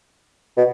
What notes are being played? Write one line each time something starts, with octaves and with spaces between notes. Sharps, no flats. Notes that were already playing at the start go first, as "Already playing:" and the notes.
B2